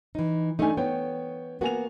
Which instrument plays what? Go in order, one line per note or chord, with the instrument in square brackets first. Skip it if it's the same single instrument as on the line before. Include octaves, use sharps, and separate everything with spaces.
[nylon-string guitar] E3 D#4
[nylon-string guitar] A3 D#4 [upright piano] D4 G#5
[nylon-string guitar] B3 [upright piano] C#5 G5
[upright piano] A#3 G#5 F7 [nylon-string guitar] B3 F#4